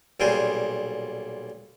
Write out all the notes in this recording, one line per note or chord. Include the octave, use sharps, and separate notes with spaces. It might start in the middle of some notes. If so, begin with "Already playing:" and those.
B1 A#2 G3 G#4 C5